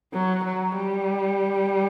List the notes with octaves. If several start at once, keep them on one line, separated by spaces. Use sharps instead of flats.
F#3
F#3
G3